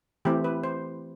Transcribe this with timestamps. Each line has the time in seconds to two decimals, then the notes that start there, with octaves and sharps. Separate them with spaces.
0.25 E3 A3 C4 G4
0.44 B4
0.64 C5